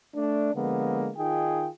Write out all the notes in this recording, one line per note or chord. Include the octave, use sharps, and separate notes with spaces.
A3 D4
D3 F3 G#3 A#3 B3
D#3 D#4 F4 G#4 G5